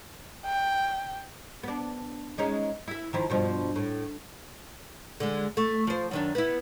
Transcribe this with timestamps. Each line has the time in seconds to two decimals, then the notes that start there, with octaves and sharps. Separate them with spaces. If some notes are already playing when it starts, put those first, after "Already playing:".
0.46 G5
1.63 B3 D4
2.38 G#3 C#4 D#4
2.88 E4 E5
3.13 D#3 F3 E4
3.30 G2 B2 F3
3.76 A2
5.20 D3 G#3
5.57 A3
5.87 F3 C5
6.11 F#2 D#3 D4
6.35 B3 E4